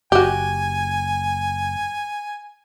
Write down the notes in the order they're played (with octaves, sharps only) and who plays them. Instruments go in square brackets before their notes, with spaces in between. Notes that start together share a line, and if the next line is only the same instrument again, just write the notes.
[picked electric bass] F#1 [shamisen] F#4 G4 [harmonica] G#5